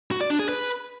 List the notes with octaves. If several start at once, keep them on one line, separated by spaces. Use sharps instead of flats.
F#4
D5
D4
G#4
B4